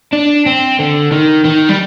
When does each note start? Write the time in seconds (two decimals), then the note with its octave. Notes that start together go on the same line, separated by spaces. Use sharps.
0.13 D4
0.46 C4
0.79 D3
1.12 D#3
1.44 D#3
1.69 G3